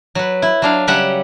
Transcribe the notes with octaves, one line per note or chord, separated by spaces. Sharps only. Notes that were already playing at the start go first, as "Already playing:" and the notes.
F#3 B4
E4
F#3 D4 F5
C#3 F#3 G3 G4 E5 F#5